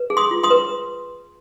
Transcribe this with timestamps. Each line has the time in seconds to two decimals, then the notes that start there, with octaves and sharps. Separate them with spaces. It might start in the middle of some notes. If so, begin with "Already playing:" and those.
Already playing: B4
0.10 G#4
0.17 C6 D#6
0.31 F4
0.43 C6 D#6
0.50 B4